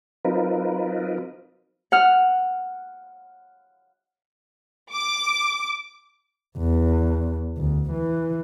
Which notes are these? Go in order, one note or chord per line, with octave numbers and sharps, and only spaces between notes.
F#3 C4 D#4 F4 A#4 B4
F#5 F6
D6
E2
D2
E3